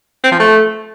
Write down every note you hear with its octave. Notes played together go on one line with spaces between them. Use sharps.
C4
F3
A3